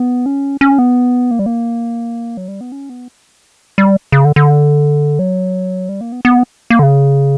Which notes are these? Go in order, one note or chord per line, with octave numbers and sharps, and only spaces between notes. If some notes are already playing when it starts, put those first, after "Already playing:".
Already playing: B3
C#4
C#4
B3
A#3
G3
A#3
F#3
G3
B3
C#4
B3
G3
C#3
D3
D3
F#3
G3
A#3
B3
B3
A#3
D3
C#3